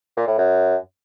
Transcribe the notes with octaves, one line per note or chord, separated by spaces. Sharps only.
A#2
A2
F#2